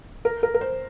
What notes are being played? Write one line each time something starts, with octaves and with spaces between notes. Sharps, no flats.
A#4
A#4
A#4
C5